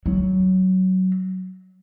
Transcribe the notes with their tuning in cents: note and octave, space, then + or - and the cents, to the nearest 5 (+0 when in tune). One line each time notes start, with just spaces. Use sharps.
F#3 +15